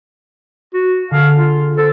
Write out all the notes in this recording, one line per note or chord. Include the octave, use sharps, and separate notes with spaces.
F#4
D3 G#4 A4 F5
F4
A4 C5